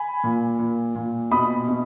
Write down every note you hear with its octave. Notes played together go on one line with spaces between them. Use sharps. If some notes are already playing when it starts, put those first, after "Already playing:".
Already playing: G#5 B5
A#2
A#2
A#2
B2 B5 D#6
B2